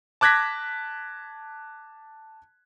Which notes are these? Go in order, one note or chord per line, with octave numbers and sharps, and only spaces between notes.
A5 D6 F#6 G#6 A#6 B6